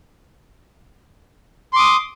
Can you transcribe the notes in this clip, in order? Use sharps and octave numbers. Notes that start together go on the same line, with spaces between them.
C6 D6 D#6